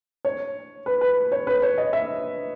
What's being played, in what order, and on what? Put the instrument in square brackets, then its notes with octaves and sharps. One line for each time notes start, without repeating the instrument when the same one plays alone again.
[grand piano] C#5
B4
B4
C#5
B4
C#5
D#5
E5